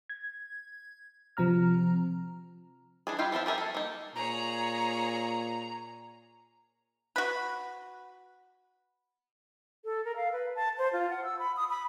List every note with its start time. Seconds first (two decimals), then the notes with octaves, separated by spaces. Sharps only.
0.10 G#6
1.37 C3 F3 C4 A#5 F6
3.07 E3 D4 G#4
3.19 G3 F4 E5 F5 G5
3.32 F3 C4 F4 E5
3.46 G4 G#4 A#4 E5 G#5
3.58 A4
3.75 A#3 D#4
4.15 A#2 G#4 C#5 A#5
7.16 F#4 B4
9.85 A4
10.05 A#4
10.16 F5
10.32 B4
10.55 A5
10.78 C5
10.93 F4
11.10 F#5
11.24 E6
11.39 B5
11.57 D#6
11.70 B5